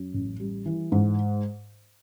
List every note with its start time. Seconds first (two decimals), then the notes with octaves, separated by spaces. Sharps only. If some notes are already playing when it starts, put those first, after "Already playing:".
Already playing: F#2
0.14 A1
0.40 G3
0.66 E3
0.92 G#2